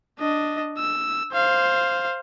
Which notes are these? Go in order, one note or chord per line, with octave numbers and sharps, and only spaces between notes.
D4 D#5
E6
C5 F5